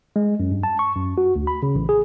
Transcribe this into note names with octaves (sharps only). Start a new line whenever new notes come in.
G#3
F#2
G2
A5
C#6
F#2
F#4
D2
B5
C#3
A1
G#4